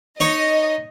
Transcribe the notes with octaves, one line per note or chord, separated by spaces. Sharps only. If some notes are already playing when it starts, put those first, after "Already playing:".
D#4 C#5 D#5